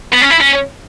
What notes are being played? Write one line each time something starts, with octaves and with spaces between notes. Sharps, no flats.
B3
C#4
E4
C#4